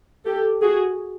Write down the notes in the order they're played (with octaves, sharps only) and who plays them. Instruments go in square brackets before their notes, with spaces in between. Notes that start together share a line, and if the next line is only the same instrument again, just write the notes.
[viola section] G4 A4
F#4 G#4